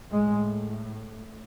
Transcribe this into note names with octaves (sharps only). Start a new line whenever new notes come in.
A2 G#3